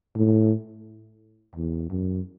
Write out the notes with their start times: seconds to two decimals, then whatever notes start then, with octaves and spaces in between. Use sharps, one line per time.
0.16 A2
1.56 E2
1.90 F#2